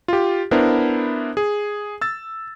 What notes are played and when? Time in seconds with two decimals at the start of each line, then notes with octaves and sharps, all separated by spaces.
0.08 F4 G4
0.51 B3 D4 E4 A#4 C5
1.37 G#4
2.01 E6 A6